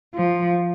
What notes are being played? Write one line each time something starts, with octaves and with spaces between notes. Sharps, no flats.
F3